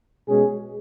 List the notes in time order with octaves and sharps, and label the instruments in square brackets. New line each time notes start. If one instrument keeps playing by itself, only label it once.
[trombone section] B2 G#3 C#4 G#4